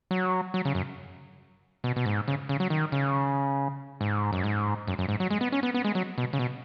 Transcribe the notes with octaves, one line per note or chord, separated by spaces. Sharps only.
F#3
F#3
C#3
F#2
B2
B2
G#2
C#3
C#3
F#3
D#3
C#3
G#2
F#2
G#2
F#2
F#2
G#2
F#3
G#3
B3
C#4
B3
B3
G#3
F#3
B2
C#3
B2